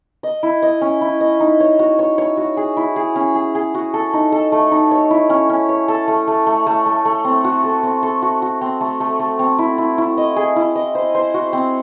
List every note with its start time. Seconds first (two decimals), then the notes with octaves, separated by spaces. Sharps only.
0.23 D#5
0.43 E4
0.62 D#5
0.81 C#4
1.01 E4
1.21 D#5
1.40 D#4
1.60 C#5
1.79 F#4
1.99 C#5
2.18 C#5
2.37 F#4
2.57 G#4
2.77 E4
2.96 G#4
3.16 C#4
3.35 G#4
3.55 G#4
3.74 F#4
3.94 A4
4.13 D#4
4.32 A4
4.52 A3
4.71 D#4
4.91 C#5
5.11 E4
5.30 C#4
5.49 C#4
5.69 C#5
5.88 A4
6.08 A3
6.28 A3
6.47 A3
6.67 A3
6.86 A3
7.05 A3
7.24 C4
7.44 F#4
7.64 A4
7.83 C4
8.03 A4
8.22 F#4
8.42 F#4
8.61 C4
8.81 A3
9.00 A3
9.19 A3
9.39 C4
9.59 E4
9.78 E4
9.98 E4
10.17 D#5
10.36 G#4
10.56 E4
10.76 D#5
10.95 C5
11.15 C5
11.34 F#4
11.53 C4